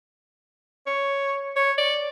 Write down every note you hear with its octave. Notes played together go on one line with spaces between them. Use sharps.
C#5
C#5
D5